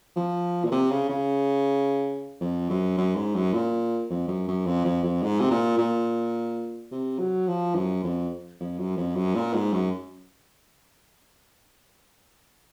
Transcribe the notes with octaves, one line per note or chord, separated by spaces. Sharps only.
F3
A#2
C3
C#3
C#3
F2
F#2
F#2
G#2
F#2
A#2
F2
F#2
F#2
F2
F2
F2
G#2
C3
A#2
A#2
C3
F#3
F3
F#2
F2
F2
F#2
F2
F#2
A#2
G#2
F#2